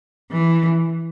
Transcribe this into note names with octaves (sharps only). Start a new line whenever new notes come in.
E3